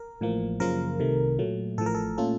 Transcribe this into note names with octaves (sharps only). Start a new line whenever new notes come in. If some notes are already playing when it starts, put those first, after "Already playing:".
Already playing: A#4
A1 A2 F3 A#3
F#2 C#3 F3 A#3 F4 A#4
C2 C3 D#3 A3
A#2 F#3 A3
A1 A2 F3 A4
A#4
A4
A#2 A3 C#4 F4 A4